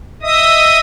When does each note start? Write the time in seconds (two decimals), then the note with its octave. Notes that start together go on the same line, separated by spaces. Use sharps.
0.22 D#5 E5 D#6